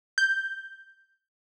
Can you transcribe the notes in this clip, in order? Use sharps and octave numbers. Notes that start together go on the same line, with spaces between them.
G6